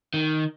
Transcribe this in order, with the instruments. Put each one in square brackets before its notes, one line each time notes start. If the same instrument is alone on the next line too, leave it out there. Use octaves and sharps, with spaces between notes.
[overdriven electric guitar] D#3